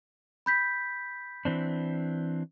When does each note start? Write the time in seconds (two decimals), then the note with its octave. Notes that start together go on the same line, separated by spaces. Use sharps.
0.46 B5 G6 B6
1.45 E3 C4 D4